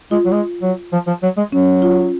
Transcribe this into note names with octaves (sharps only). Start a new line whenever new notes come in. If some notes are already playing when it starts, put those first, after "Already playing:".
G#3 F4
F#3
G#3
F#3
F3
F3
F#3
G#3
F#3 C#4
F4